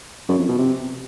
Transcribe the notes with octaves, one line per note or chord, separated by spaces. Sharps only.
F#2
F2
B2
C3